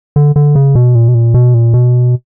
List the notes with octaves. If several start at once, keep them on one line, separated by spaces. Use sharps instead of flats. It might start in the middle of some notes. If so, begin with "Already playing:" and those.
D3
D3
C#3
B2
A#2
B2
A#2
B2
A#2
B2